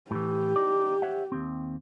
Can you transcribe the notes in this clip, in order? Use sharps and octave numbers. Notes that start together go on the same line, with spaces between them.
A2 E3 G4
D#4 D5
C#5 E5 F#5
D#2 C4